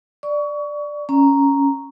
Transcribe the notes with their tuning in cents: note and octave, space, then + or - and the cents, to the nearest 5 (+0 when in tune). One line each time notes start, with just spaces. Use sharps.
D5 +5 C#6 +30
C#4 +0 A#5 +0